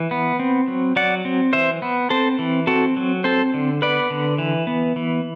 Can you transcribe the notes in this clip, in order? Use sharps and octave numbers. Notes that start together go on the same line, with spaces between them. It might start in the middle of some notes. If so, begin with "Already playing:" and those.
Already playing: E3
B3
C4
F#3
F#3 D5 F#5
C4
E3 C5 E5
B3
C4 A4 C5
E3
C4 F#4 A4
F#3
C4 A4 C5
D3
B3 B4 D5
D3
E3
B3
E3